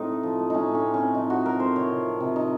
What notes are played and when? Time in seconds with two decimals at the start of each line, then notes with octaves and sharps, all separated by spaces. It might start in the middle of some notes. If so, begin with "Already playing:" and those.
Already playing: A2 C4 D#4
0.09 A3
0.23 F3
0.39 A3
0.50 A2 C#4 D#4
0.69 A2
0.75 C#4
0.84 C4
0.94 C#4
1.00 C4
1.14 F3 D#4
1.30 A2 F#4
1.45 F3 A#4
1.60 C4 C5
1.76 C3 C#5
1.91 C3
2.06 F3
2.20 C3
2.36 C4 D#4